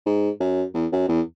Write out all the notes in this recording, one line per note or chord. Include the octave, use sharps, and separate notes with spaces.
G#2
F#2
E2
F#2
E2